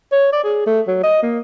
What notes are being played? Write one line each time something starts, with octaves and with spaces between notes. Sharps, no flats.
C#5
D5
G#4
A3
F#3
D#5
A#3